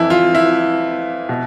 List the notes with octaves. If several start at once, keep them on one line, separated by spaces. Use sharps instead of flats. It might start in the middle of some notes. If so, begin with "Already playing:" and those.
Already playing: F2 E3 E4
F4
E4
B2